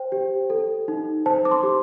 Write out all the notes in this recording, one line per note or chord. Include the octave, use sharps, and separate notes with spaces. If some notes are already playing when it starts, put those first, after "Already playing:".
Already playing: C5 G5
G4
A4
D#4
C5 A5
D6
C6
G4